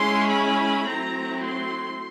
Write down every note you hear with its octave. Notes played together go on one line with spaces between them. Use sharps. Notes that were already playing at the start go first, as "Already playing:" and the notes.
Already playing: G#3 C#4 E4 C6
B5
F#3 A3 C4 E4 A#5
C6